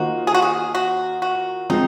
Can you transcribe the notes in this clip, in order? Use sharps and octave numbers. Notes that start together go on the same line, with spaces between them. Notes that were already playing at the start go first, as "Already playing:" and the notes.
Already playing: D#3 A#3 F4 F#4 C5 D#5
G#4
F#4
G#4
F#4
F#4
F3 G#3 C4 D#4